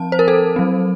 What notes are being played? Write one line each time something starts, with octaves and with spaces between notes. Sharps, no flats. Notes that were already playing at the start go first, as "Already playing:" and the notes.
Already playing: F3 C4 A5
C5
A#4
A4
F#3 C4